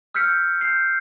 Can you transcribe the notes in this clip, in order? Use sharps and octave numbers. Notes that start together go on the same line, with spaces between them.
E6 F6 G6 B6 C#7
G6 C7